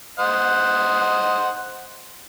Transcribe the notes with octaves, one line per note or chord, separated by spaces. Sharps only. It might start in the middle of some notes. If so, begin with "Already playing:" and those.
C5 D#5 F#5